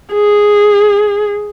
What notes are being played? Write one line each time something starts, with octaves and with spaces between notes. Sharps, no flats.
G#4